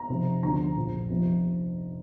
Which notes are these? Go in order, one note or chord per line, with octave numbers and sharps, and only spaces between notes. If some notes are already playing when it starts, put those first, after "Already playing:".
Already playing: A#5
F1 F2 C3 F3
D2 D3 F3 A#5
A#1 A#2 F3
F1 F2 C3 F3